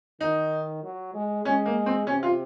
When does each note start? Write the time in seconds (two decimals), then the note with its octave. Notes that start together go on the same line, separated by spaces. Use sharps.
0.21 D#3 D#4
0.83 F#3
1.14 G#3
1.45 G#3 C#4
1.66 A#3
1.86 C4
2.07 C3 C#4
2.23 F4